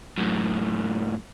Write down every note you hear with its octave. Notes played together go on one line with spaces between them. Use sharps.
F#2 A2